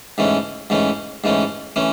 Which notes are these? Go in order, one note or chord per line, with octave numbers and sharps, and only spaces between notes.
G#2 E3 A3 C#4
G#2 E3 A3 C#4
G#2 E3 A3 C#4
E3 A3 C#4